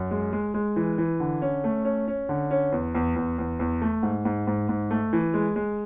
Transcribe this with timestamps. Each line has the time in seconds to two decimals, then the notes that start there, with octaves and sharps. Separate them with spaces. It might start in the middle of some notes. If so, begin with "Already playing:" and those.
Already playing: F#2
0.11 G#3
0.33 G#3
0.54 G#3
0.76 E3
0.98 E3
1.20 D3
1.42 C#4
1.64 A3
1.85 C#4
2.08 C#4
2.29 D3
2.51 C#4
2.72 E2
2.95 E2
3.16 E2
3.38 E2
3.59 E2
3.82 A3
4.03 G#2
4.25 G#2
4.47 G#2
4.69 G#2
4.91 A3
5.13 E3
5.34 G#3
5.56 G#3